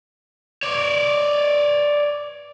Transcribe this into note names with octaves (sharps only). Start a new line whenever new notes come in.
C#5 D5